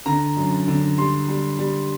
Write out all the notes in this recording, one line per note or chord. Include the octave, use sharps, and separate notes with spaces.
D3 A#5
F#2
D3
G3 C6
G3
G3